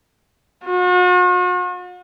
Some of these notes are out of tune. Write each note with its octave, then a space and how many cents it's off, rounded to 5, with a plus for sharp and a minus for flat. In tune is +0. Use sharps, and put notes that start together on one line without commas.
F#4 -45